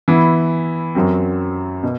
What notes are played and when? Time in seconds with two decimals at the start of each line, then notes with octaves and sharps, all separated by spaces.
0.08 E3 B3 E4
0.95 F#2 F#3 C4
1.83 B2